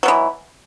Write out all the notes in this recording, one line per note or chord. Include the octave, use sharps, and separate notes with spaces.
B2 E3 F#3